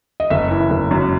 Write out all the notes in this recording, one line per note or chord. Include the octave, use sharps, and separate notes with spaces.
D#5
F#1 E5
E3
F#1
F#2